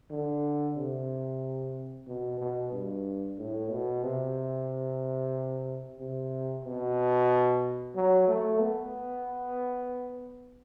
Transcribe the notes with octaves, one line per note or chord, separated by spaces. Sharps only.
D3
C3
B2
B2
G2
A2
B2
C3
C3
B2
F#3
A3
B3